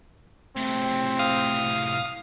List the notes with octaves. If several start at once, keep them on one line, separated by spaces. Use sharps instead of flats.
A2 C3 C4
F5 D#6